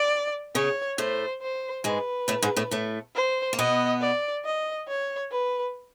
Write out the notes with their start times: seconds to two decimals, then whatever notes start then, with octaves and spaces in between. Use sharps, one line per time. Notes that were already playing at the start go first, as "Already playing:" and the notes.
Already playing: D5
0.55 C#3 C#4 C#5
0.98 A2 A3 C5
1.42 C5
1.84 G#2 G#3 B4
2.28 A2 A3
2.43 G#2 G#3
2.57 A2 A3
2.71 A2 A3
3.15 C5
3.53 A#3
3.58 B2 B3 D#5
4.01 D5
4.45 D#5
4.88 C#5
5.31 B4